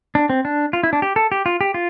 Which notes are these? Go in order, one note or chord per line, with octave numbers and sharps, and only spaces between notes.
D4
C4
D4
F4
E4
D4
G4
A4
G4
F4
G4
F4